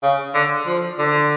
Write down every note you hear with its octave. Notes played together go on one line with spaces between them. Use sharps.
C#3
D3
F3
D3